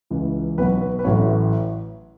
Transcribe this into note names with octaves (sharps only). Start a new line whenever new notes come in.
C#2 C#3 E3
B1 B2 F#3 B4
B4
B4
A1 A2 F#3 C#5